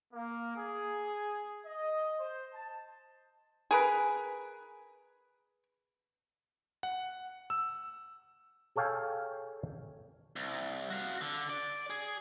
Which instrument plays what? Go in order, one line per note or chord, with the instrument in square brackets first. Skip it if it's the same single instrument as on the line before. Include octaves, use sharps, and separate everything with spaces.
[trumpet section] A#3
G#4
D#5
C5
A5
[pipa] G#4 A#4 B4
[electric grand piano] F#5
E6
[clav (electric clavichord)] G#4 A4 C#5 F5 G5 G#5
[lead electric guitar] C2
F#4 F5
D3
D5
G#4